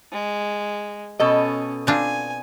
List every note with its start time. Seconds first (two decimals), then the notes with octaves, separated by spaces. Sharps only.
0.12 G#3
1.20 B2 C#4 A4 D#5
1.87 C4 D4 F4 G#5